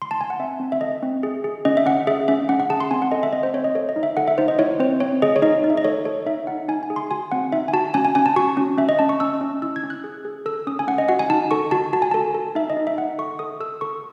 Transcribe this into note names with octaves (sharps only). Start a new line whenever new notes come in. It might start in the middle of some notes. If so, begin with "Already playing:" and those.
C6
A5
G#5
F#5
C4 E5
C4
E5
A4 D#5
C4
G#4
G#4
C#4 D#5
E5
C#4 F#5
G#4 E5
C#4 E5
C#4 F#5
F#5
G#4 A5
C6
C4 G#5
F#5
A4 D#5
E5
C4 D#5
C5
C4 C#5
D#5
A4 C#5
D#5
D#4
E5
A4 F#5
E5
D#4 C5
D#5
E4 C#5
C4 C5
C4 C#5
G#4 D#5
C#5
D#4 D#5
D#4
E5
D#5
A4 C#5
A4 C#5
D#4 E5
D#4 F#5
D#4 G#5
G#5
G#4
C6
F#4 G#5
C4 F#5
D#4 E5
G#5
F#4 A5
C#4 G#5
G#5
C#4 G#5
A5
F#4 C#6
C#4
C#4 E5
D#5
C#4 A5
C#6
C#4 E6
C#4
E4 E6
G#6
C#4
F#6
G#4
G#4
A4 E6
C#4 D#6
G#5
C#4 F#5
D#5
F#4 F#5
G#5
D#4 A5
A4 C#6
F#4 A5
F#4 A5
G#5
A4 A5
A4
D#4 E5
D#5
D#4
E5
D#4 F#5
A4 C#6
A4 D#6
A4 E6
A4 C#6